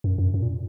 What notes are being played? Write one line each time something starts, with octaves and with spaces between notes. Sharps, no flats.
F#2
F#2
F#2
A#2